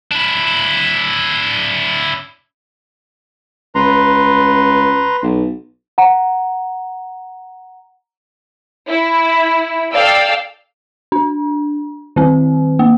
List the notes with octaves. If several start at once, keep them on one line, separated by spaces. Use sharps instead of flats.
D4 E4
C#2 B4 A#5 C6
B1
F#5 A#5
E4
A4 D5 F5 G5 E6
D4
D#3 C4
A#3